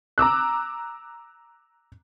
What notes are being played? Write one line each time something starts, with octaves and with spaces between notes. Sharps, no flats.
A#5 D6 E6 F#6